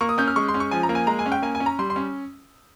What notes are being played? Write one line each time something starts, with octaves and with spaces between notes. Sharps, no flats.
A#3 C#6
D#6
C#4 G6
F6
G#3 C#6
C6
C#4
C#6
F3 G#5
A#5
A#3
G#5
G#3 A#5
G#5
C#4
G5
A#3 G#5
G#5
C#4
A#5
G3 C6
C6
C#4